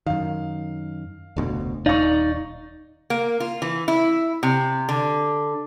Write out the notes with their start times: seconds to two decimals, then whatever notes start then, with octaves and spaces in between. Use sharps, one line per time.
0.06 F#2 D#3 F5
1.36 F1 D2 B2
1.86 D#1 D#4 D5 F5 C#6
3.10 A#3
3.40 F4
3.62 E3
3.88 E4
4.43 C3
4.89 D3